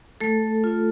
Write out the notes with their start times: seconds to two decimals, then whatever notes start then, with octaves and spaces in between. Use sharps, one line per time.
0.21 A3 A4
0.64 F4